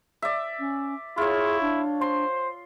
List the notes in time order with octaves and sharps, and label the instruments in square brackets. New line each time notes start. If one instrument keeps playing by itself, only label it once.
[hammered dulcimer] D5 E5
[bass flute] C#4
[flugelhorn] E4 [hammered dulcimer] F4 C#5 [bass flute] G#4
[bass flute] D4
[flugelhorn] C5 [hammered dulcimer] C6